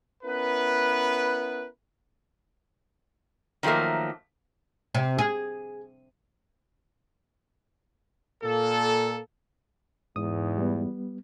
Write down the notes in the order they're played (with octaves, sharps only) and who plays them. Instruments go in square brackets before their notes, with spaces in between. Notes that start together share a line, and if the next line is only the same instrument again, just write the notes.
[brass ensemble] B3 C#4 E4 A#4 B4
[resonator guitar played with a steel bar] D#3 F3 F#3 A3 A#3
[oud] C3
G#4
[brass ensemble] A#2 A#3 A4
[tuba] E2 [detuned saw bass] G#2 [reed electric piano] D#6
[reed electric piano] G3 B3